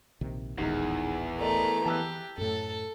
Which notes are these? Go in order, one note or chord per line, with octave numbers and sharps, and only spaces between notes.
A#1 C3 D#3
D#1 A1 E2 D#3 G#3 D#4
A3 A#4 D5 D#5 A#5
E3 G4 A5 E6 F#6
F#2 A2 A4